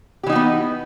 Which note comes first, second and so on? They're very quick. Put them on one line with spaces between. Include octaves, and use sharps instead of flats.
G4 E3 D#4 F#4 B3